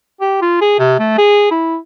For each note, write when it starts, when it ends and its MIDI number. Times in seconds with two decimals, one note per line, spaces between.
0.21 0.39 67
0.42 0.57 65
0.61 0.75 68
0.79 0.95 48
0.99 1.14 57
1.18 1.47 68
1.51 1.78 64